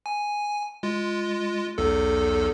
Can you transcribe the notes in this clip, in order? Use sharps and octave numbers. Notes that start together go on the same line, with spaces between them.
G#5
G#3 F4
B1 E2 A4